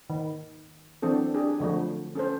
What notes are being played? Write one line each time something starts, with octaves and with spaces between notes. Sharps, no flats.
D#3
E3 F#3 C4 D4 A4
D4 G4 G#4
D3 F3 F#3 A3
C#4 A4 C5